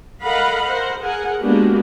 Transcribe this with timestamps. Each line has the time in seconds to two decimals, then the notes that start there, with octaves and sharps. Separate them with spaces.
0.23 A4 A#4 D#5 F5 F#5 B5
0.66 A#4 C5 F#5
0.99 G#4 A#4 F#5 G#5
1.39 G#3 A#3 B3 D4 F#4 G4